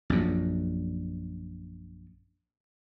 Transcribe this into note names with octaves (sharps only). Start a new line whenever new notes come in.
A#1 F#2